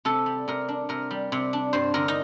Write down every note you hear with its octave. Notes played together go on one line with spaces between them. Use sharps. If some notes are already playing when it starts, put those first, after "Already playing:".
C3 A4
G3
C3 A#4
D4
C3 A#4
G3
C3
D4
G2 C5
D3 A#4
D#4